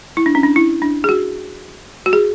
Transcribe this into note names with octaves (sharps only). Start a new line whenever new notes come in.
E4
D4
C#4
D4
E4
D4
G#4
F#4
F#4
G#4